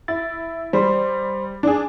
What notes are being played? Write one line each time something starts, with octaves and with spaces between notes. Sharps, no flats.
E4 A6
G3 C5 C6
D4 G#4